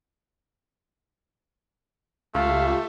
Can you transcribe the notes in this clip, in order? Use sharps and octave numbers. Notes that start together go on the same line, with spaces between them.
C#2 A3 F4 G4 E5 F5